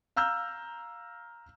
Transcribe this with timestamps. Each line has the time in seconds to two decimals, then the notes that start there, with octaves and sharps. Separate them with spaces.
0.16 F5 A#5 E6 F6 G6